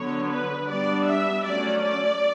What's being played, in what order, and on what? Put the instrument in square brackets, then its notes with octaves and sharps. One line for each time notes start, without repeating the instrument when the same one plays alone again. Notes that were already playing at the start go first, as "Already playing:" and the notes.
Already playing: [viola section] D3 F#3 B3 C#5
B4
G3 B3 D4 D5
E5
F#3 A3 C#4 D5
D5